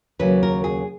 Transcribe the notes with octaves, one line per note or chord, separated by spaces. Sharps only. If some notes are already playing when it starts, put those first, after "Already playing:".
D#2 C#3 F#3 B4
A#4
G#4